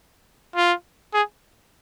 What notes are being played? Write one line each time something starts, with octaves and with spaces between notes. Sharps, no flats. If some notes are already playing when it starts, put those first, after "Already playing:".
F4
G#4